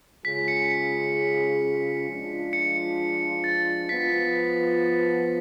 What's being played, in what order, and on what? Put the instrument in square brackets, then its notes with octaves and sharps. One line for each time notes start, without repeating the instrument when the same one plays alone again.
[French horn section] C#3 G#3 C#4 F4 G#4 [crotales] B6
[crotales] C#7
[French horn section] F3 G#3 D4 F4
[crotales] C#7
A6
[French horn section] F3 B3 F4 [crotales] B6